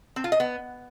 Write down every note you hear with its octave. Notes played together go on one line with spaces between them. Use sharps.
C4
F4
D#5
B3